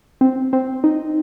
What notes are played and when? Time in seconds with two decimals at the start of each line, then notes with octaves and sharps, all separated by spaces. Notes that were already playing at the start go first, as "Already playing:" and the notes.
0.21 C4
0.53 C4
0.84 D#4